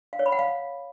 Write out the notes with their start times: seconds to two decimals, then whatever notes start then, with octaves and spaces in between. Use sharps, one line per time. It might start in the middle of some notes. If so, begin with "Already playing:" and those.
0.13 F5
0.19 C#5
0.26 B5
0.32 F#5
0.39 F5